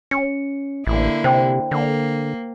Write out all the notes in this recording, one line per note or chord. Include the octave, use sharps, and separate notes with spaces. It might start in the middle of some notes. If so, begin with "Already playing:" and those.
C#4 C#7
A1 D3 A#3 E4
C3 C5 G5
D3 A#3